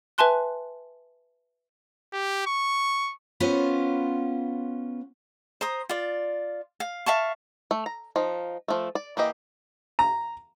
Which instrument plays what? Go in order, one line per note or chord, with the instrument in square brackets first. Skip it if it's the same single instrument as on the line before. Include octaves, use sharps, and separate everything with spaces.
[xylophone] B4 E5 G#5 A5 C6 F#6
[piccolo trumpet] G4
C#6
[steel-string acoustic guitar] B3 C#4 F4 C5
[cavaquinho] C5 A#5 D#6
F4 D5
F5
E5 F5 A5 C#6
[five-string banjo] A3
A#5
F3 D#4
F3 A3
D5
E3 A#3 G4 D#5
[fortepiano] A#5